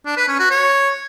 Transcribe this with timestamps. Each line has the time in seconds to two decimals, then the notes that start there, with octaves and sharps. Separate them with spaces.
0.06 D4
0.17 B4
0.28 C#4
0.39 F#4
0.50 C#5